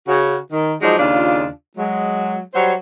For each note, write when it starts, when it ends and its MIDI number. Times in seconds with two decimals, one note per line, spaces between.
0.07 0.38 49
0.07 0.38 66
0.52 0.73 51
0.82 0.98 53
0.82 0.98 54
0.82 0.98 56
0.82 0.98 63
0.82 0.98 74
0.99 1.48 39
0.99 1.48 49
0.99 1.48 62
0.99 1.48 65
1.77 2.38 54
1.77 2.38 56
2.54 2.73 54
2.54 2.73 55
2.54 2.73 72
2.54 2.73 73